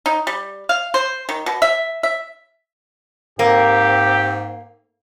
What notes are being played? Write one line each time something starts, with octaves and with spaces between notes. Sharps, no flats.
D#4
G3
F5
C5
D#3
B2
E5
E5
G#2 A#3 C4 G4